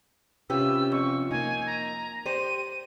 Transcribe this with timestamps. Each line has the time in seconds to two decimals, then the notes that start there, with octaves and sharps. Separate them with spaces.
0.50 C3 C#4 F4 G4 B4 E6
0.92 F2 C#6
1.31 A#3 D#4 G#5
1.66 A#5
2.26 G4 C5 D5 D#7